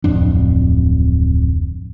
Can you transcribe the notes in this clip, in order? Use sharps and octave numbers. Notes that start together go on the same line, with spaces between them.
D1 F2 D4